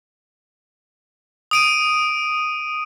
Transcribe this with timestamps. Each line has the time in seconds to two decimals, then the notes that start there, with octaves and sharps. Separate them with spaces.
1.51 D#6 D7 D#7